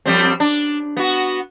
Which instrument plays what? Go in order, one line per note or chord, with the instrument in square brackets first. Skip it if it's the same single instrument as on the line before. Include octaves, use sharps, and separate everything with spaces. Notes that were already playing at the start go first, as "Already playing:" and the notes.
[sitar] F2 G3 C4
D4
B3 F#4